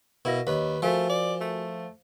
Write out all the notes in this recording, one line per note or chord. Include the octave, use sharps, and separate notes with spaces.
B2 E4 A#4 F5 A#6
D#2 B4 C#5 D#5
F3 A3 F#4 A#4 G#5
D5
A3